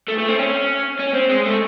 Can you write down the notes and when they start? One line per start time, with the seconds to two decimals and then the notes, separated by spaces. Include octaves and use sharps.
0.08 A3
0.18 A3
0.28 C4
0.39 C#4
1.00 C#4
1.14 C4
1.29 G#3
1.45 A3